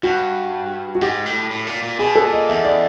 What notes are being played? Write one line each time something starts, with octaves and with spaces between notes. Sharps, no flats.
G2 F#4
F#4
G#2 G4
A2
A2
A#2
A#2
B2 G#4
A4
A#2
D#5
E2 E5
D5